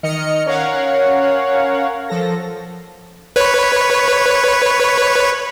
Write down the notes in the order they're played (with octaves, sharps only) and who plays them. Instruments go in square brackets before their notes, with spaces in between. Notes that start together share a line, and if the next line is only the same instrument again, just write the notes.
[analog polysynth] D#3 D#5 F6 C#7
C#4 A#4 C#5 F5 F#5
F3 A4 A#6
[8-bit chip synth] B4 C#5